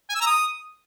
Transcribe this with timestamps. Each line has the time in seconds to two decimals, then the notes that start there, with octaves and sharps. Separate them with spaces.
0.09 G#5
0.15 E6
0.21 A#5
0.26 D#6